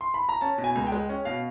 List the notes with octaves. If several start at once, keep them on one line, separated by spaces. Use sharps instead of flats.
C6
B5
A#5
C#4 A5
B2
G#5
C#2
G5
G#3
C#4
B2 F5